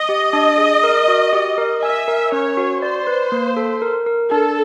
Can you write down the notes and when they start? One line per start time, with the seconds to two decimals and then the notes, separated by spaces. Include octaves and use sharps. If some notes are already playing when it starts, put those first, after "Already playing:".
Already playing: D#5
0.09 G4
0.33 D4
0.58 G#4
0.83 A#4
1.08 F#4
1.33 G4
1.58 A#4
1.82 E5 G#5
2.08 A#4
2.32 C#4 C#5
2.57 F#4
2.82 C5 D5
3.07 B4
3.32 A#3
3.57 A4
3.82 A#4
4.06 A#4
4.31 D4 A4